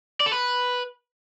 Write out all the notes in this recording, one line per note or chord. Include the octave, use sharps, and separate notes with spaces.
D5
A4
B4